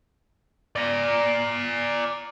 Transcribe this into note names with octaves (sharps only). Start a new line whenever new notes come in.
D5 A#5